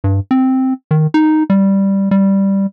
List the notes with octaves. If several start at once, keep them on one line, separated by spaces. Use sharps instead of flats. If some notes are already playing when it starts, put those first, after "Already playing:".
G2
C4
D#3
D#4
G3
G3